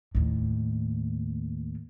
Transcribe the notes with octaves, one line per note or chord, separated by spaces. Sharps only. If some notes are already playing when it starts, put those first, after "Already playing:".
D#2 A2